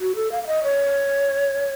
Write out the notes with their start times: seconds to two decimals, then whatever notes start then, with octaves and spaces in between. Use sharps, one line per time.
0.01 F#4
0.16 A4
0.32 F5
0.43 F5
0.47 D#5
0.64 C#5